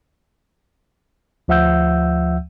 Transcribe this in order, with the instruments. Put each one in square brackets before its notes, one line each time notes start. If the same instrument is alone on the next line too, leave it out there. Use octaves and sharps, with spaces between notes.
[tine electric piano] D2 F3 E5 F#5 E6 G6